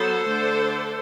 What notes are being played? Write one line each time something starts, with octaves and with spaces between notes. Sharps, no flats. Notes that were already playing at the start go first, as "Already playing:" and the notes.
Already playing: F#3 B3 A4 C5
D3 A3 D4